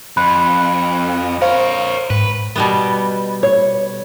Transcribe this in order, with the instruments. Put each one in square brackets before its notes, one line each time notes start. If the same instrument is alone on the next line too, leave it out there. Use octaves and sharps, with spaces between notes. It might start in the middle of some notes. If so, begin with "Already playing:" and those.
[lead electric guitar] F2 [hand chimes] B5 [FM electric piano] F#6
[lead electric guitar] A#4 C#5 [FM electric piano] C5 F5
[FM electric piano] G#2 [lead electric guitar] B4
[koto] B2 G3 B3
[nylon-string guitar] C#5